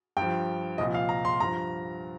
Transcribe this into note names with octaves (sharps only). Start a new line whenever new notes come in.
G2 G5
F3
C2 A#2 F3 D#5
F5
A#5
C6
G2 F3 A#5